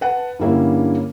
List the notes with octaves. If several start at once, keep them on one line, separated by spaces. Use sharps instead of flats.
B4 F#5 A5
G2 D3 G3 A#3 C#4 E4